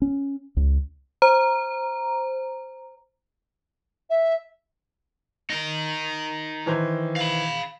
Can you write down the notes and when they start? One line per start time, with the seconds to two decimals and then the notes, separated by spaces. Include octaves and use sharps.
0.02 C#4
0.57 C#2
1.22 C5 A#5
4.10 E5
5.50 D#4 A#4
6.66 D#3 E3 C5
7.16 F5 B5